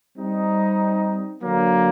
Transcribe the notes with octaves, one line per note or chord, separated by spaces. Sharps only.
G3 C4 D#4
D3 F#3 A#3